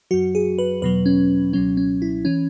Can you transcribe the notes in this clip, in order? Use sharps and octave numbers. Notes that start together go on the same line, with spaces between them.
F#2 F#3 F#4
G#4
B4
E2 B2 F#3 B4
C#4
C#2 B2 F#3 C#4
C#4
E4
E3 C#4